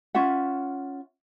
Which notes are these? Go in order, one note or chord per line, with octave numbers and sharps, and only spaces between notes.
C#4 F4 E5 F#5